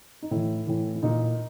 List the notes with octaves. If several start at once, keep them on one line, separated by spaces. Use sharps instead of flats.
D#4
A2 E3 E4
A2 E3
E4
A#2 D#4